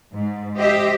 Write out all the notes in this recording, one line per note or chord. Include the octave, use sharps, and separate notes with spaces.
G#2
G4 C5 D#5 E5